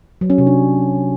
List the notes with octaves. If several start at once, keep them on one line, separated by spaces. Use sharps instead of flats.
F#3
C#4
C3
D4